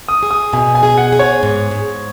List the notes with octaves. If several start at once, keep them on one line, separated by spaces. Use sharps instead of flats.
D#6
G#4
D#6
B2 G#5
G#5
G#4
F#5
G#4
C#5
G#2
G#2